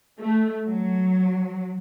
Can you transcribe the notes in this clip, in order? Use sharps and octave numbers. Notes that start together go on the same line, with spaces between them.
A3
F#3